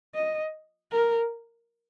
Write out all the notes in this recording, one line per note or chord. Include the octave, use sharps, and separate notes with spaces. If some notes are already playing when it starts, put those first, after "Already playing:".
D#5
A#4